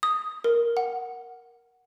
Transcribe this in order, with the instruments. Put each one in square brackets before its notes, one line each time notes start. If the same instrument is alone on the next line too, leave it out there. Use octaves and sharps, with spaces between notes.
[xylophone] D#6
A#4
F#5